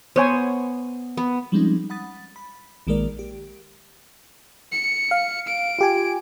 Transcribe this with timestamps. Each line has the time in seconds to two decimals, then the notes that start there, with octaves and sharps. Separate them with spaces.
0.16 B3 C5 C#5 G#5
1.17 B3
1.52 F3 G3 G#3 C4 C#4 D#4
1.90 F#5 B5 D#6 A6
2.36 B5
2.87 A#1 D#3 G#3 A#3 A#4 D5
3.19 G4
4.72 C#7
5.11 F5
5.48 D7
5.79 F4 G4 G#5